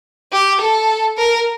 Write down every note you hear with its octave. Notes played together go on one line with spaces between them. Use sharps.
G4
A4
A#4